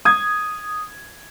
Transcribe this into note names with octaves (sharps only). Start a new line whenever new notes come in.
D#6 G#6